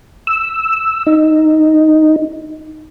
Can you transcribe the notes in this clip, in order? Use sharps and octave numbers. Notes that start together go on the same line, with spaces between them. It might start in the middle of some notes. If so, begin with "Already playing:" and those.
E6
D#4